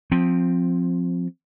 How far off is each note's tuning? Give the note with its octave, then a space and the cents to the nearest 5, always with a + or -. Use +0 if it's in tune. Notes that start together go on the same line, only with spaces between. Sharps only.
F3 +15 C4 +0